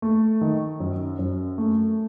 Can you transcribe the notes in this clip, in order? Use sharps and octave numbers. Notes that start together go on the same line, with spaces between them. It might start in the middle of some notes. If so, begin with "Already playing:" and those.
A3
D#3
F#2
F#2
A3